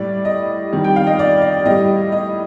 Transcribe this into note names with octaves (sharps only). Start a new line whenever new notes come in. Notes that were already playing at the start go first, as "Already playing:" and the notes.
Already playing: A2 G3 D5
D#5
F2 D#3 G3
G5
F5
D#5
D5
D5
A2 G3 D#5
D#5